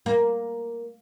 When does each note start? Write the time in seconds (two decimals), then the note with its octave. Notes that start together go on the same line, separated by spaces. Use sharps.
0.06 A#3